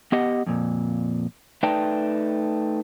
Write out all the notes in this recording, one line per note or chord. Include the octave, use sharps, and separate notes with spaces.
B3 G4 D#5 F#5
F2 A#2
A3 D#4 B4 D5 G5 A5